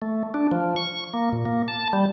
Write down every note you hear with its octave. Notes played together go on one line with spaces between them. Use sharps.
A3
D4
F3
C#6
A#3
A#2
A#3
A5
G3